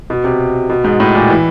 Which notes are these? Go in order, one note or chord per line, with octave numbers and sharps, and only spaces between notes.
B2
C3
B2
G#2
A2
A#2
E3